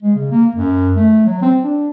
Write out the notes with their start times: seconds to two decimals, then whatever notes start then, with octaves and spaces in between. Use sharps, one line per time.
0.03 G#3
0.15 C#3
0.31 A#3
0.55 F#2
0.96 A3
1.26 F#3
1.42 C4
1.64 D4